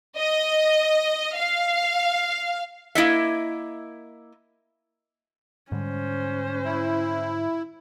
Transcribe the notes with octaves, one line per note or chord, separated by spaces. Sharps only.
D#5
F5
A#3 E4 D#5 E5
G#2 D3 G3 C#4 C5
E4